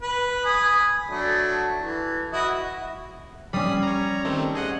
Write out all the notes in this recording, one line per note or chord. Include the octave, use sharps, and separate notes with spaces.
B4
G#5 B5 D#6
F#3 A3 D4
E3
E4 F#4 D#5
G3 C#4 B5 D#6 C7
C#5 A#5
D#3 A3 C4
G#4 D#5 F#5